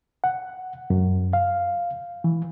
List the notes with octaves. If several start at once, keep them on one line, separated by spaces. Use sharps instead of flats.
F#5
F#2
F5
E3